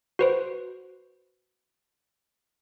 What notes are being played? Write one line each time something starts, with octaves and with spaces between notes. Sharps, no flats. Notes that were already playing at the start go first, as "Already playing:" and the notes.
F#4 B4 C5